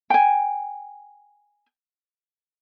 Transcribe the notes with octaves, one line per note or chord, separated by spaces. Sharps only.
G5 G#5